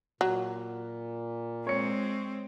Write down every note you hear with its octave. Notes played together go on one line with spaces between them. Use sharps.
A#2 F#3
G#3 C4 C#5 C#7